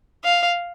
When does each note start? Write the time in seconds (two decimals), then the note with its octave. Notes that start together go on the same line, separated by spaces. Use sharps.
0.24 F5